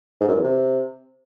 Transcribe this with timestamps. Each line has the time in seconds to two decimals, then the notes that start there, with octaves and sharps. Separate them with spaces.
0.21 G#2
0.28 F#2
0.36 E2
0.44 C3